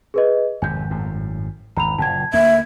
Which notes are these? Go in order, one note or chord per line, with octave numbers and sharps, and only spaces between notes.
G#4 B4 D#5
G#1 F2 C3 G#5 G6
G#1 F#2 A2
G#1 E2 A#5 B5 F7
F#1 A#2 A5 G#6
D2 A#3 E5 G#6